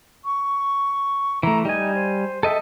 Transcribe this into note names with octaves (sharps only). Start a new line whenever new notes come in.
C#6
E3 A3 A#5
G3 D#4 G#5
C5
A4 D#5 E5 G5